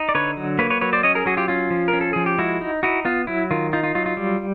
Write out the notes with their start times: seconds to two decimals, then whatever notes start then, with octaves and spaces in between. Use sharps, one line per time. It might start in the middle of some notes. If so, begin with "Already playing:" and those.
Already playing: D#4
0.09 D5
0.15 D3 B4 C#5
0.37 F#3
0.59 A#3 B4 C#5
0.70 B4 C#5
0.81 F#3 B4 C#5
0.93 C5 D5
1.03 C#4 C#5 D#5
1.15 G#4 A#4
1.26 F#3 F#4 G#4
1.37 F4 G4
1.48 C#4 F4
1.70 F3
1.88 A#4
1.93 C#4
2.01 A4
2.13 F3 G#4
2.26 G4
2.38 G#3 E4 F#4
2.61 D#4
2.83 D#4 E4 F#4
3.05 B3 F4
3.27 F#3 E4
3.51 D#3 F4
3.73 D#4 F4
3.83 F4
3.95 F#3 F4
4.06 F4
4.17 G3